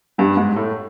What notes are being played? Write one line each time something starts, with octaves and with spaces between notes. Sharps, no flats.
G2 G3
G#2 G#3
A2 A3